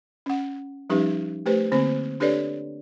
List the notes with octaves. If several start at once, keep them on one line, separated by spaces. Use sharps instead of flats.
C#4 F#5
F3 G3 C#4 D#4 G4 B4
A3 G4 B4 C5
D3 A#3 C4 C5
D4 G4 A4 B4 C#5 D5